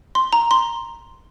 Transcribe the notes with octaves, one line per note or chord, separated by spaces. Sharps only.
C6
A#5
C6